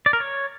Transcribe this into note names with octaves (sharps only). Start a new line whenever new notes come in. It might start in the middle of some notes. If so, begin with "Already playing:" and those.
D5
A#4
C#5